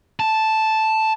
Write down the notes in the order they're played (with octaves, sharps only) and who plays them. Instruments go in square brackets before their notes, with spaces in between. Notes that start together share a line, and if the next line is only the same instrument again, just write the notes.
[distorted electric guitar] A5